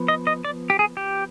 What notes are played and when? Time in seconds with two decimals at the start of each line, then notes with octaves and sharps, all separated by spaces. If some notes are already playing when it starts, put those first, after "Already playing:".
Already playing: F3 B3
0.08 D#5
0.27 D#5
0.45 D5
0.70 G4
0.79 G#4
0.97 G4